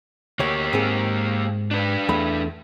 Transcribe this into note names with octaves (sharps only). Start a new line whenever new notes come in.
D2 A#3 G4 C#5
G#2 C4 G#4
D4 B4
E2 A3 B5